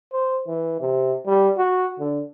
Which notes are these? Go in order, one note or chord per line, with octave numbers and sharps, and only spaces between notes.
C5
E3
C3
G3
F#4
D3